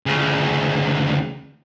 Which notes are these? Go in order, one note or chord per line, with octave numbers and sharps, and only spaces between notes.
D2 C#3